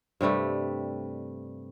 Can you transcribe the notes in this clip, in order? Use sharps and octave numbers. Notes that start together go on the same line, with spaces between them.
G2 C3 G3 A3